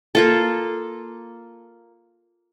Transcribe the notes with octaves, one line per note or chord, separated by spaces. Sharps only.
A#3 F4 A4